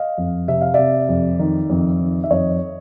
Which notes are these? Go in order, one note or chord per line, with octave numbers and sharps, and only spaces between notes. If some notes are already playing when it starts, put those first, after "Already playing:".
Already playing: D#5 F5
F2
C3 E5
F5
C3 D5 E5
F2
D#3
F2
D#3
E5
F2 C#5 D#5